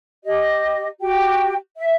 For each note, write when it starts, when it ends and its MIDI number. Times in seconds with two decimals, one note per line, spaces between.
0.24 0.86 67
0.24 0.86 75
1.00 1.54 66
1.00 1.54 67
1.00 1.54 79
1.76 1.94 76